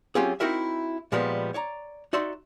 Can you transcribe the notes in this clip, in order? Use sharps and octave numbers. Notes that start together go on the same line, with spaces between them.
F#3 C4 C#4 F4 G4 G#4
C4 D#4 E4 F#4 A#4 E5
A#2 F3 G3 G#3 B3
C#5 D5 A#5
D#4 F#4 D5 E5 C6